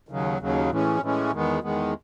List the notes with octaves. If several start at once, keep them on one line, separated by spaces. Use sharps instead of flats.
D#2 C#3 F#3
D#2 C#3 F#3
A2 E3 G#3 C#4
A2 E3 G#3 C#4
E2 D#3 G#3 B3
E2 D#3 G#3 B3